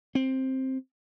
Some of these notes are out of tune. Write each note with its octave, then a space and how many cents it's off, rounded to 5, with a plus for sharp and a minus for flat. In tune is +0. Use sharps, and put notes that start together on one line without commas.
C4 +10